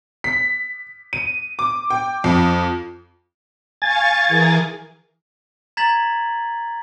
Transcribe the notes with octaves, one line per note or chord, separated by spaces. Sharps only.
B6
D#7
D6
G5
F2
F5 G#5 C#6 A6
E3 G#4 A#4
A#5 G#6 A6 B6 F#7